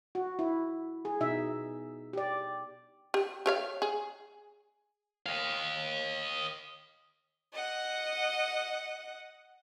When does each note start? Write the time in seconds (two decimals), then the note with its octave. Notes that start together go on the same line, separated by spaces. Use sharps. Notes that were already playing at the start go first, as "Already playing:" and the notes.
0.15 F#4
0.39 E4
1.05 G#4
1.21 B2 D#4 E5
2.13 G4 D5
3.14 G4
3.46 G4 C#5 F5
3.82 G#4
5.26 D#5 F5
7.53 D#5 F#5